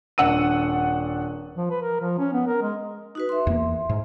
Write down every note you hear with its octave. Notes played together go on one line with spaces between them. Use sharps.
D#1 D4 F#5 E6 D#7
F3
B4
A#4
F3
C#4
B3
A#4
G#3
D#4 F#4 B4
E5 C6
E2 A#3
G#2